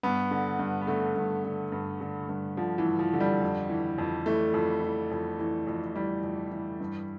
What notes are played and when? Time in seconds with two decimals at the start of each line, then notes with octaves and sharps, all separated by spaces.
0.03 G2 B3
0.31 D3
0.59 G2
0.81 B3
0.87 D3 A3
1.16 G2
1.44 D3
1.72 G2
2.01 D3
2.29 G2
2.57 D3 F3
2.78 E3
2.85 G2
2.99 F3
3.13 D3
3.20 G3
3.41 F2
3.70 E3
3.98 F2
4.26 E3 A3
4.54 F2
4.83 E3
5.11 F2
5.39 E3
5.67 F2
5.96 E3 G3
6.23 F2
6.51 E3
6.80 G2